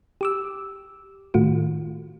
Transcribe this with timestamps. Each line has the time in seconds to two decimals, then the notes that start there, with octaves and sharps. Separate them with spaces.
0.21 G4 D6 E6
1.34 A2 D#3 A3 F4 F#4